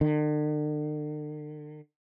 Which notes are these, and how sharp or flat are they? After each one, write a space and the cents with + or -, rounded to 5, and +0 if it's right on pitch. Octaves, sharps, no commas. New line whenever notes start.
D3 +45